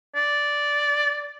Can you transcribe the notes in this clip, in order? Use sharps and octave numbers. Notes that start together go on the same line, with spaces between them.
D5